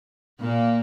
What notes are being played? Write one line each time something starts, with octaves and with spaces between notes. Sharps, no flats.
A#2 A#3